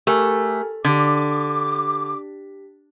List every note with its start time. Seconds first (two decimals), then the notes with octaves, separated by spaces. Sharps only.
0.07 A3 G4 A#4 G#5
0.84 D3 G4 D6 B6